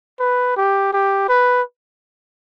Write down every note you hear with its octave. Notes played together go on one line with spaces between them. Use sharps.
B4
G4
G4
B4